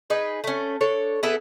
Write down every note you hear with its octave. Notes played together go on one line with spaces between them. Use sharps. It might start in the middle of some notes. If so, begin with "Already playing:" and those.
D#4 G#4 B4
A3 C#4
D4 A4 C#5
B3 E4 G#4 A4